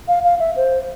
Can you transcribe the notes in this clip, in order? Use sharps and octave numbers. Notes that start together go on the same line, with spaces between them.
F5
F5
E5
C5